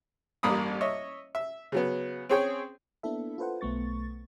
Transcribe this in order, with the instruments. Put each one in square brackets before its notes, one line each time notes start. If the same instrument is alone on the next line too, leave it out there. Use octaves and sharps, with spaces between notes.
[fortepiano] A1 G2 G3 A#3 B5 D#6
C#5 D#5 E5
E5
C#3 F#3 B3
C4 C#4 G#4 C#5 G5
[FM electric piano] A#3 B3 D4 E4 A4 E5
F4 A4 B4 C5 F#5
B1 A3 B3 C#6 A6